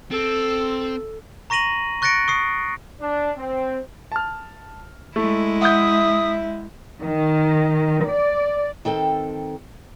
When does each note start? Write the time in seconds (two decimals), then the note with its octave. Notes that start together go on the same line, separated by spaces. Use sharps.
0.11 C4 A4
1.50 A#5 C#6 A#6 D#7 F#7
2.02 C#6 F#6 A6 A#6 C#7 D7
2.28 C#6 D#6 C7
3.01 D4
3.36 C4
4.12 A5 F6
5.16 G#3 A3 E4
5.61 E5 F#5 D#6 G6
7.01 D#3
8.06 D5
8.85 D#3 C4 A4 G5